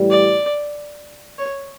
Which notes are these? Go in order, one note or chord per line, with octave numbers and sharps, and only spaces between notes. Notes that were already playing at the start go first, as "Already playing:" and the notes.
Already playing: A2 E3 G3
D5
C#5